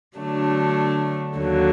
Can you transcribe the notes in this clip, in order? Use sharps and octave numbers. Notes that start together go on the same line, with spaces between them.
D3 F#3 A3 D4
D#2 D3 F#3